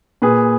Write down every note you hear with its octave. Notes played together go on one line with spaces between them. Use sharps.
A#2 G#4 B4